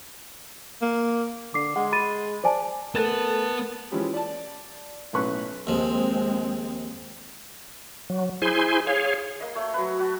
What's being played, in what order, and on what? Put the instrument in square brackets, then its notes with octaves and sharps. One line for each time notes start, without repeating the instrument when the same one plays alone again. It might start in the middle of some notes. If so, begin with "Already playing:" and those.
[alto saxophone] A#3
[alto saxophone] D3 [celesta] D6 C7
[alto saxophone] G#3 [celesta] F#5
[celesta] B5 A6 D#7
[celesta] C5 G#5 A5 [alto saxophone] D5
[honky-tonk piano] A3 A6 E7 [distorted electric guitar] B3 B4 [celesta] A#4 [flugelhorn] A5
[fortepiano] E3 F3 G#3 C#4 E4 G4
D5 A5
B1 A2 C#4 B4 C#6 F#6
[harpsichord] D#2 F3 [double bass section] G#3 C4
[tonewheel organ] F#3
E4 G#4 C5 G#5 C6
G#4 C#5 F5
[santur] A#3 D#5
A3 C#5
F#3 B4
F#4 A5